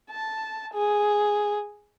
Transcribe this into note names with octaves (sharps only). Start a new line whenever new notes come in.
A5
G#4